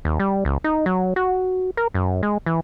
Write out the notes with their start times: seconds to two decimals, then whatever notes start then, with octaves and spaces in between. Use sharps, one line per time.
0.05 D#2
0.20 G3
0.45 C#2
0.64 D#4
0.86 F#3
1.16 F#4
1.77 A#4
1.94 F#2
2.23 G#3
2.46 E3